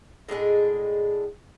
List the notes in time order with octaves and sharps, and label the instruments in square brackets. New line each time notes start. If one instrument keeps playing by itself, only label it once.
[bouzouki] A2 G#3 D4 G#4